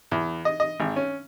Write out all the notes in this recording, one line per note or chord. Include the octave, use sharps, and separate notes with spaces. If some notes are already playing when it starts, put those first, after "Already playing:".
E2
D#5
D#5
G#1
C#4